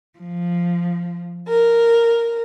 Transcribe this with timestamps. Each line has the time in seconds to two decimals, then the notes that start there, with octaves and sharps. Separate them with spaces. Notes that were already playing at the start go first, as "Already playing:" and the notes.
0.19 F3
1.47 A#4